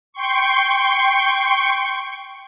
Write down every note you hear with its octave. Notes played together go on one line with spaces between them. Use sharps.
G5 C6 C#6